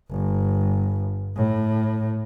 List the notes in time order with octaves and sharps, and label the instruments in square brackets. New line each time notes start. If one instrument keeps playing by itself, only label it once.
[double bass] G1
A2